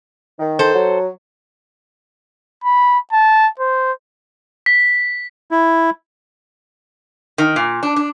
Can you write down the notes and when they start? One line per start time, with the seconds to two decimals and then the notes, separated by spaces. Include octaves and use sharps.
0.39 D#3
0.59 A4 C5
0.74 F#3
2.64 B5
3.13 A5
3.60 C5
4.66 B6
5.51 E4
7.38 D#3
7.56 A#2
7.83 D4
7.96 D4